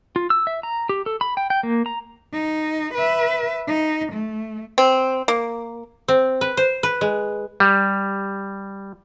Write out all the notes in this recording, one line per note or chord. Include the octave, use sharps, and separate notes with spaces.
F4
E6
E5
A#5
G4
A4
B5
G5
G5
A#3
A#5
D#4
B4 E5
D#4
A3
C4
A#3
C4
B4
C5
B4
G#3
G3